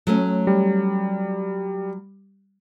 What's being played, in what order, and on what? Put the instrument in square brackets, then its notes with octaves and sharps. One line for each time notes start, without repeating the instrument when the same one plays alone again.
[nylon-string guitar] F#3 A3 C#4
[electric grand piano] G3